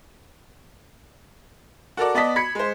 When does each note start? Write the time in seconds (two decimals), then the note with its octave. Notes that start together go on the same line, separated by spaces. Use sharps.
1.97 F#4 A4 A#4 D5
2.15 B3 D5 D#5 A5 B6
2.36 B5 G#6 B6 C#7
2.55 G#3 C5